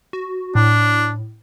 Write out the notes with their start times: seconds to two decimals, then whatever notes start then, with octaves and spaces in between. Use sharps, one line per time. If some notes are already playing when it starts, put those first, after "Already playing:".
0.13 F#4
0.55 A2 D4